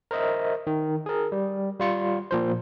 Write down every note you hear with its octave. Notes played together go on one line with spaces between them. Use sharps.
A#4 C5 D#5 E5
D#3
G#4 A#4
G3
G3 F4 C#7
A#2 F3 C5